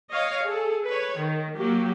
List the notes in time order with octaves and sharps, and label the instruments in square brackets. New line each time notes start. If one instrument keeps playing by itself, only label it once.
[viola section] C#5 D#5 F5
G#4 A4
B4 C#5
D#3
F#3 A#3 G4